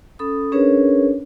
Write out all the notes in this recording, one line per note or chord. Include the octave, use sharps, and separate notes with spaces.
C#4 A4 B5 D#6
C#4 D4 G#4 A#4 B4 C#5